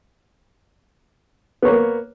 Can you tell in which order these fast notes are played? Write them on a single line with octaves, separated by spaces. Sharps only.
B3 C#5 A#3